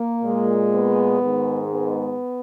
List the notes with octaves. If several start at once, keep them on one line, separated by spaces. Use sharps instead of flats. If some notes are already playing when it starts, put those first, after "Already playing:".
Already playing: A#3
A#2 G#3
B3
G#2 D#3 G#3
B3